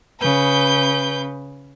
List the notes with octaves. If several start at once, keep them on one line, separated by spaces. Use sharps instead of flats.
C#3 B4 G6